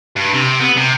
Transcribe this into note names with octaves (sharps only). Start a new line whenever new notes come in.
G2
C3
B3
C3